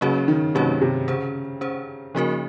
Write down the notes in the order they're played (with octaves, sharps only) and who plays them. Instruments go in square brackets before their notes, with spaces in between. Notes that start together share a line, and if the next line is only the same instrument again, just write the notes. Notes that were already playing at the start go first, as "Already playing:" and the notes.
[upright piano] C#3 [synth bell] F#3 A#3 C#4 F#4 C#5
[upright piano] D#3
[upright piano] C3 [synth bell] F#3 A#3 C#4 F#4 C#5
[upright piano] C3
[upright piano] C#3 [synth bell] C#4 G#4 C5
[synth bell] C#4 G#4 C5
[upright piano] C#3 [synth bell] F3 A#3 D#4 F#4 A#4